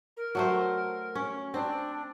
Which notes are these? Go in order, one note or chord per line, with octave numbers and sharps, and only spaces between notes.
A#4
F#3 A3 C5
C#4
C4 D4